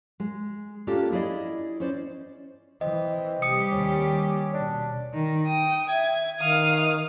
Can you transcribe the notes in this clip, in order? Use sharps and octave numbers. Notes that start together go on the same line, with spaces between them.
G#3
A#3 C#4 D4 F4 G4 A4
E4 G#4 D5 D#5
C#4 C5 D5
E3 C4 D#5
C3 G3 G4 D#6 C#7
D#2 D#3 C#4
B2 D4
D#3
G5 D#6
E5 G#6
D#3 F5 D#6 F6